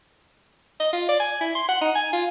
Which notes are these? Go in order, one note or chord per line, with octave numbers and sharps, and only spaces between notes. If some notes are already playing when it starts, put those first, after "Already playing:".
D#5
F4
D5
G#5
E4
C6
F#5
D#4
G#5
F4